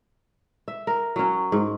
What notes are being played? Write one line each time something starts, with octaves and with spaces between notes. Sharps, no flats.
E5
A#4
F#3 C#4
G#2